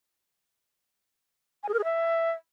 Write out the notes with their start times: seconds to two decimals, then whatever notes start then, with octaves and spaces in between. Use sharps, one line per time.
1.63 G#5
1.69 G#4
1.74 A#4
1.79 G#4
1.84 E5